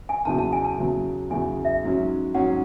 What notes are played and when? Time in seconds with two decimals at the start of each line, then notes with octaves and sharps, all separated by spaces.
0.09 G#5
0.25 E2 C#3 F#3 A5
0.38 A5
0.53 G#5
0.64 A5
0.78 E2 C#3 F#3
1.30 E2 C#3 F#3 G#5
1.65 E5
1.83 G#2 F#3 C#4
2.35 G#2 F#3 C#4 F#5